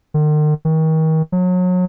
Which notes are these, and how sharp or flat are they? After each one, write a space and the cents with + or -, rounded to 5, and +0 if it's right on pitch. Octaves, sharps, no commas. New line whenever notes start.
D#3 -45
D#3 +35
F#3 -30